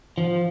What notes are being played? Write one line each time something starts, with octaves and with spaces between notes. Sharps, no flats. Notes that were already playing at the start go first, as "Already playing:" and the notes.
F3